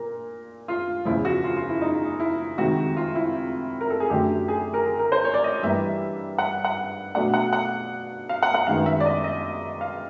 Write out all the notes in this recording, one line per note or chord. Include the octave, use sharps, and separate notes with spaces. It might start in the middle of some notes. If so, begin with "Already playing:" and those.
Already playing: A#2 A#3 A#4
F4
E2 C#3 F3 E4
F#4
F4
F4
E4
D#4
E4
F2 C3 D#3 G#3 F#4
F4
E4
A#4
A4
G#4
F#2 D3 F#3 A3 G4
G#4
A#4
G#4
A#4
C5
C#5
D5
D#5
G2 E3 G3 A#3 E5
F#5
F#5
B2 F#3 A3 D4 F#5
F#5
F#5
F5
F#5
F#5
F#2 D#3 G#3 B3 F5
E5
D5
D#5
D#5
F5